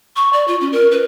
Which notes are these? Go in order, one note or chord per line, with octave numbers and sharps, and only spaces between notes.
C#6
D5
F4
C#4
A#4
B4